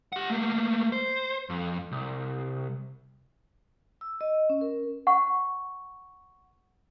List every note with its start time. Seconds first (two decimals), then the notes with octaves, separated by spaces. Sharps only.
0.13 G4 F#5
0.30 A3 A#3
0.92 C5
1.50 F2
1.92 C2
4.01 E6
4.21 D#5
4.50 C#4
4.61 A#4
5.07 F#5 C#6